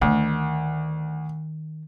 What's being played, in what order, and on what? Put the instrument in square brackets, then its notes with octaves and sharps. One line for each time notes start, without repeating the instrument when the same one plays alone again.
[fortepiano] D2 [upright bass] D#3